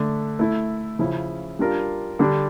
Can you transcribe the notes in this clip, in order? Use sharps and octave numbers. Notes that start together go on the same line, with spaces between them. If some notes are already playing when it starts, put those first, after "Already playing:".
Already playing: D3 A3 D4
A3 E4 A4
C#3 F3 C#4 E4
G3 D4 F4 A#4
D3 G3 D4